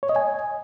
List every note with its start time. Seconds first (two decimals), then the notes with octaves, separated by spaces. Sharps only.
0.03 C#5
0.09 D#5
0.16 G#5